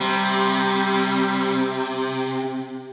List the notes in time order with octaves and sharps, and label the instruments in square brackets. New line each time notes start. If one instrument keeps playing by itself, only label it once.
[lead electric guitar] C3 [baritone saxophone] G3